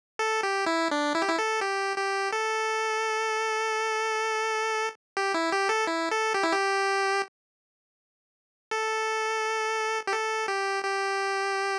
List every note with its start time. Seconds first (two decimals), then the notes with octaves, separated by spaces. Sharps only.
0.19 A4
0.43 G4
0.67 E4
0.91 D4
1.15 E4
1.22 G4
1.28 E4
1.39 A4
1.61 G4
1.97 G4
2.33 A4
5.17 G4
5.34 E4
5.52 G4
5.69 A4
5.87 E4
6.11 A4
6.34 G4
6.43 E4
6.53 G4
8.71 A4
10.07 G4
10.13 A4
10.48 G4
10.85 G4